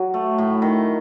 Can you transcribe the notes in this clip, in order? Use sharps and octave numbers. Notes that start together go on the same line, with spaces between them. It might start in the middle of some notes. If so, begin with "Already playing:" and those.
Already playing: F#3
A3
A2
D#3